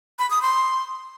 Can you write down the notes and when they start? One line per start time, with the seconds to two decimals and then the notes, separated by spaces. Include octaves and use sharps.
0.19 B5
0.30 D#6
0.42 C6